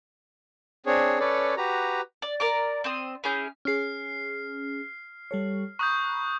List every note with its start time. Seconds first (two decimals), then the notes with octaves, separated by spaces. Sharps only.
0.86 C4 D4 G#4 C#5
1.20 C#4 A4 B4 C#5 D5
1.57 F#4 G4 B4 A#5
2.22 D5
2.40 A#4 D5 D6
2.84 C4 C6 D#6
3.24 C#4 E4 G#4 G6
3.65 C#4 G#4 F6 C7
5.31 G3 A4 C#5
5.79 A#5 B5 C#6 D#6 F#6 G6